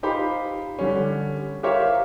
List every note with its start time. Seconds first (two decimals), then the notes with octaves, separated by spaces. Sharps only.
0.03 D#4 F4 G4 C5 B5
0.79 D3 G3 C#4
1.63 G4 A#4 C5 C#5 E5 F5